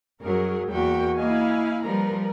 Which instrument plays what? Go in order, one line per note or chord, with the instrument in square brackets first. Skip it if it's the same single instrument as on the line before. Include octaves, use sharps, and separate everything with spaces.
[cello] F#2 F#3 [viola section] G#4 A#4
[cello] E2 F#4 [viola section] A#3 A#4 G5
[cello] A#3 D#5 [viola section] E4 F5 G#5
[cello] F3 G3 [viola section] A#4 B4 A#5